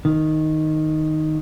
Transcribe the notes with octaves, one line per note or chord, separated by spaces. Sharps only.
D#3